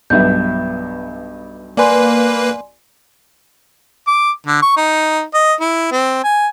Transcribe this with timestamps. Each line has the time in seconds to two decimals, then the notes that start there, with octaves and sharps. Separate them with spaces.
0.10 B1 G2 E5 G6
1.77 A#3 B4 D5 G#5 C6
4.07 D6
4.46 D3
4.63 C#6
4.77 D#4
5.34 D#5
5.61 E4
5.92 C4
6.24 G#5